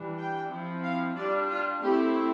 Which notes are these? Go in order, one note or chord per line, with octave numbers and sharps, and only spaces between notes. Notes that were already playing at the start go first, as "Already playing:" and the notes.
Already playing: E3 G3 D4
G5
F3 C4 E4
F5
G3 D4 F4 D5
F4
A3 C4 E4 G4